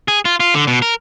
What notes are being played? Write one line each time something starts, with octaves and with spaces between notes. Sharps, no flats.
G#4
F4
F4
D3
B2
A#4